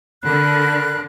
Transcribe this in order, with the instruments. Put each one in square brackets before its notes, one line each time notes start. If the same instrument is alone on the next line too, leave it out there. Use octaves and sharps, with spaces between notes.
[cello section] D3 [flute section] A#4 B5 F#6